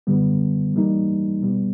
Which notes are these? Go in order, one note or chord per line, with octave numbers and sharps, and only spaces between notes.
F#2 D3 G3 B3
E3 G3 A#3 D#4
E2 B2 G3 B3